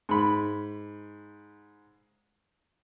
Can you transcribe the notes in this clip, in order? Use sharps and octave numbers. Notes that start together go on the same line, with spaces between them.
G#2 B5